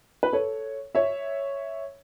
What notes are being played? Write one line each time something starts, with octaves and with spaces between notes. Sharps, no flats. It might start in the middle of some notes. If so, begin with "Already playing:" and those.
B4
A4 C#5
C#5 E5